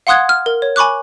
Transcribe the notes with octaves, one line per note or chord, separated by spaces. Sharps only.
F5 F#5 C6 D#6 F#6 G#6
F6
A#4
C#5
G#5 B5 C#6 D6 F#6